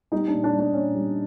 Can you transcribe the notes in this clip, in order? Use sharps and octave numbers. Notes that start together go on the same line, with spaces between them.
G3 D#4
A#2 D4
D4
G3
D4
A#2 C#4
G3